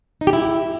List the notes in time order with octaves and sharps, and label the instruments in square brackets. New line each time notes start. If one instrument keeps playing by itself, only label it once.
[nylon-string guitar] D#4
G4
E4